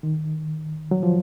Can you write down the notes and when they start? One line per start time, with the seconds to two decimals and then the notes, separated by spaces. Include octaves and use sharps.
0.03 D#3
0.91 F#3
1.03 F3